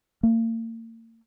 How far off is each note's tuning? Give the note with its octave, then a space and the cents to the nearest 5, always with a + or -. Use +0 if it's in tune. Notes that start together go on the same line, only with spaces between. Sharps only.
A#3 -40